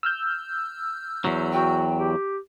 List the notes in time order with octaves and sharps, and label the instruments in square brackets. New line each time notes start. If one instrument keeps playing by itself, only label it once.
[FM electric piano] E6 F6 G6
[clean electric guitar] E2 F#3
[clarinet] F#4 [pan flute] G5
[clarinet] G4